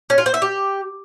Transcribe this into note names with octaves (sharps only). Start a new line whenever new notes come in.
C#4
F4
C5
E5
G4